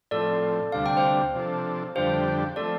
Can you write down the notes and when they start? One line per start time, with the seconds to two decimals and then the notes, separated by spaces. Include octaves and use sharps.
0.11 A2 F3 C4 A4 D5
0.72 D2 C3 G3 D4 F5
0.86 G5
0.97 C5 F5
1.35 C3 F3 D4 A4
1.95 F2 D3 G3 D4 G4 C5 F5
2.56 F3 A3 C4 A4 D5